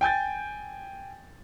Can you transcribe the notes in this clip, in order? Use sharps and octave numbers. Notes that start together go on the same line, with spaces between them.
G5 G#5 G6 A6